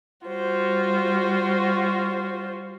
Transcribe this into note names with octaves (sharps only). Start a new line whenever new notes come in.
G3 F4 F#4 C5